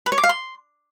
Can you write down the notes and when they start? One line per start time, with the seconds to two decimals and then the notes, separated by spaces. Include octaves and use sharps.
0.06 B4
0.12 C#5
0.18 D6
0.23 F5
0.29 C6